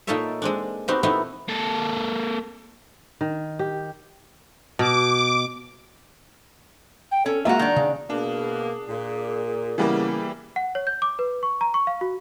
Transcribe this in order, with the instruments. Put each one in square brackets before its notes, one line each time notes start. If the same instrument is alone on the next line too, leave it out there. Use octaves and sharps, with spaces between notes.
[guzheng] A#2 A#3 D#4 A4 C#5 E5
G#3 C4 D4
B3 C4 D#4 F#4 G4
A#2 A3 B3 C4 D#4 E4
[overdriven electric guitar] A#3 A4
[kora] D#3
G4
[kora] B2 [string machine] D6
[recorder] G5
[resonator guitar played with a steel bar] C#4 [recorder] A4
[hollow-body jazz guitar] G#3 A#3 E5 [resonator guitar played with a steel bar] F4 F#4 [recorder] A#5
[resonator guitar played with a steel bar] D#3 D4
[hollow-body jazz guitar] C#3
[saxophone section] B2 A#3 [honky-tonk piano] D4 [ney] G#4
[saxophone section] A#2
[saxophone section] C#3 B3 [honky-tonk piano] E3 G3 A#3
[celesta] F#5
C#5
G6
D6
B4
C#6
A#5
C#6
F5
F#4